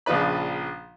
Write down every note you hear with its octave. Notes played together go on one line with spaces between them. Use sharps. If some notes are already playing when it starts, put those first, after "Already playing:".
A#1 C#3 F3 D4 B4 B5